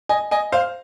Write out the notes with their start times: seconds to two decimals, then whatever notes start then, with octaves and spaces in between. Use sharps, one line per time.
0.09 D#5 G#5
0.31 D#5 G#5
0.52 C5 F5